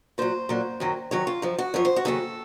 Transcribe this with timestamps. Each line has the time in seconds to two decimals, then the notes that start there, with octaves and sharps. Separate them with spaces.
0.18 A#2 F#3 C5
0.49 A#2 F#3
0.80 F#2 D#3 F#3
1.11 F#2 D#3 F#3 C#5
1.27 F4
1.42 F#2 F3
1.58 F#4
1.74 F#2 F3 C#5
1.85 C5
1.96 F#4
2.05 D#2 C#3 F#3 A4